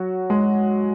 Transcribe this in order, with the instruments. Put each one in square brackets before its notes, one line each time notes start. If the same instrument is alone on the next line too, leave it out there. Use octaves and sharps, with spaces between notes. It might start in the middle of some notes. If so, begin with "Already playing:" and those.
Already playing: [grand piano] F#3 F#4
G#3 G#4